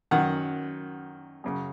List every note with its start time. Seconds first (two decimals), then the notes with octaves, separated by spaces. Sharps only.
0.11 F#2 D#3 F#5
1.44 F#2 C#3